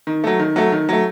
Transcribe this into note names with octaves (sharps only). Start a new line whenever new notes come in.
D#3
F#3 A3
D#3
F#3 A3
D#3
F#3 A3